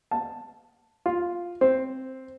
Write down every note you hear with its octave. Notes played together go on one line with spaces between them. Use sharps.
A5
F4
C4